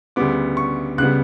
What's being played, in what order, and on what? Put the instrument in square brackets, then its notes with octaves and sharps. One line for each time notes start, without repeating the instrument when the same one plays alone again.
[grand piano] D2 C#3 G3 B3 D6
C#6
C#2 C#3 G3 B3 F#6